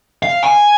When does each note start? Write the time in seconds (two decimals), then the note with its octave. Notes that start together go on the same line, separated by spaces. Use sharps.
0.23 F5
0.43 G#5